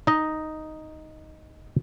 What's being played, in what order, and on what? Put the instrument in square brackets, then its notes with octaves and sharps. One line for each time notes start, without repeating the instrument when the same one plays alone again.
[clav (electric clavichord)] D#4 D#5